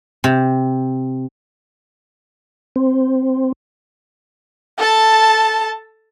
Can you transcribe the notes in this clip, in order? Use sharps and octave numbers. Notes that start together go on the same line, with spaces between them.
C3
C4
A4 A5